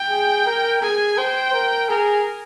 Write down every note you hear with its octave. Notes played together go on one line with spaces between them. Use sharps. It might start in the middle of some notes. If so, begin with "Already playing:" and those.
Already playing: G5
G#4
A#4
G#4 G#5
C5 G5
A#4
G#4 A#4